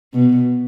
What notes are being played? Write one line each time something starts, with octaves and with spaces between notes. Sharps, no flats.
B2